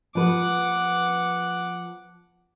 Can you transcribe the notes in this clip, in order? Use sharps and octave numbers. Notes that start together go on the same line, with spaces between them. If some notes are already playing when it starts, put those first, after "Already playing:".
F3 B4 F#5 D6